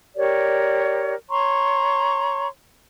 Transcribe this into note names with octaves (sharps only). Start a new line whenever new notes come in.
G4 A#4 C#5 D5
C#5 A#5 C6 C#6